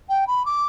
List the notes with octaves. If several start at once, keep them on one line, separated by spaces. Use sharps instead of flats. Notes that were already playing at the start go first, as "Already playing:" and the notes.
G5
B5
D6